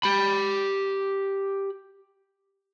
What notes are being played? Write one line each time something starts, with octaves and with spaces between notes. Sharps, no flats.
G4 B5